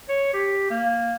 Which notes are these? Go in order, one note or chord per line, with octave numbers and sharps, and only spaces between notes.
C#5
G4
A#3